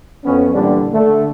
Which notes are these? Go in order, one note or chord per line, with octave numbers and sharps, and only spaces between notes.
F2 B3 C#4
A#2 D3 E3 G3 D4
D3 A3